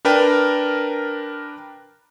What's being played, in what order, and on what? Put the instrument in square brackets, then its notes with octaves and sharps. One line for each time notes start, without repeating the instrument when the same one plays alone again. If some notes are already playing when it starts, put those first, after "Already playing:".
[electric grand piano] D4 A#4 B4 G5 A5 A#5